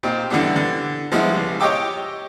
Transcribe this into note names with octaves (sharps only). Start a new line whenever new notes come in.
A#2 C4 D#4 G4
D3 E3 G3 B3 D4
D3
F3 G3 G#3 B3 E4
C#2
G4 C#5 D#5 G5 D6 E6